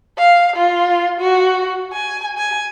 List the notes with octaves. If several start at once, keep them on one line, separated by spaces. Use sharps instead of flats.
F5
F4
F#4
G#5
G#5